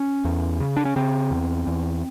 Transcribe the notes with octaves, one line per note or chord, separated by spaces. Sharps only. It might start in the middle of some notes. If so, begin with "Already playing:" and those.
Already playing: C#4
E2
C#3
D4
C#4
C#3 C4
E2
E2